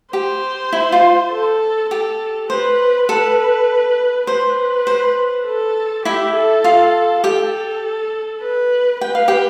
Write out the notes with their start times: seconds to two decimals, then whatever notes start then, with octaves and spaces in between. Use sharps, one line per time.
0.13 G4 C5
0.72 E4
0.92 F4
1.32 A4
1.90 G4 A4
2.50 B4 C5
3.09 A4 B4
4.27 B4 C5
4.87 C5
5.46 A4
6.05 E4 G4 E5
6.35 A4
6.64 F4 F5
7.24 G4 A4 G5
8.42 B4
9.01 B4 G5
9.15 F5
9.28 G4 G5